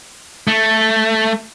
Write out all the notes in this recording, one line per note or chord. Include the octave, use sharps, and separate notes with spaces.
A3